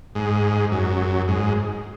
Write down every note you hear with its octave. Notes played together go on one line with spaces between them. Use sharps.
G#2
F#2
G#2